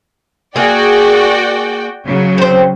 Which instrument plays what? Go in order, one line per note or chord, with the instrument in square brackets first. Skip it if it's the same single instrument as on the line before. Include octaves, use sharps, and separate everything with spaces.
[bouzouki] A#3 G#4 [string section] F#4 D5 G5
[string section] C#3 F#3
[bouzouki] C4 C5